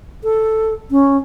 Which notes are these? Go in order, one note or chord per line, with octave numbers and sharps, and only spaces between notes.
A4
C#4